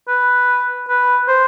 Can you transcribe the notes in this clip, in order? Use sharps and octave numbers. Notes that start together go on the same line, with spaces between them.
B4
B4
C5